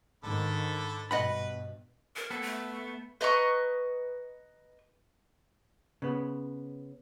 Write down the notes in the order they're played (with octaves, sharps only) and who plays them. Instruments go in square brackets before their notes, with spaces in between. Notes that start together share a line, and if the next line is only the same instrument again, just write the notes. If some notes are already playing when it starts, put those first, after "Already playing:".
[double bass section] G#2 D#3 [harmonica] D3 A4 B5
[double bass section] G2 B2 [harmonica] B4 [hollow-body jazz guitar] D#5 F#5 B5
[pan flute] A#4
[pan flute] A#3 [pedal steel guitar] B3 A4
[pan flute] A3
[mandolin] B4 D#5 A#5 C#6
[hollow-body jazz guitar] C#3 B3